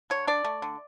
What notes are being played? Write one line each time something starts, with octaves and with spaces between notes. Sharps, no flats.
D3 C#5
D4 D5
A3
D3